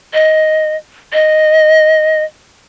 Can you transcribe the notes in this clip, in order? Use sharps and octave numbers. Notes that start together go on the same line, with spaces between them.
D#5
D#5